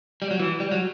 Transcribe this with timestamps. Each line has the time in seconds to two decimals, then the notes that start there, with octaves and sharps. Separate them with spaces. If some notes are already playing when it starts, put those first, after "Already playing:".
0.22 G3
0.31 F#3
0.39 E3
0.60 G3
0.71 F#3